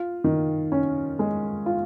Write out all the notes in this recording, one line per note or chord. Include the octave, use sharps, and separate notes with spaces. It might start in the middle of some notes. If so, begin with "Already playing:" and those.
Already playing: F4
D#3
C#4
G#3
F4